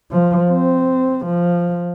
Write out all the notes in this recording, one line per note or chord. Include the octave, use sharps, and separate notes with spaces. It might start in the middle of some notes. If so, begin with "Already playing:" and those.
F3
C4
F3